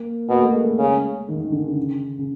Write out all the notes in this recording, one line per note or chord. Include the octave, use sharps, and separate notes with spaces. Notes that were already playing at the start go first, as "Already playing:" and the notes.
Already playing: A#3
B2 A#3
A3
G#3
A3
C#3 G#3
D#3
D#3
D3
C#3
C#3